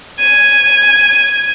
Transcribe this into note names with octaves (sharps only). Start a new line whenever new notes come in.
G#6 D#7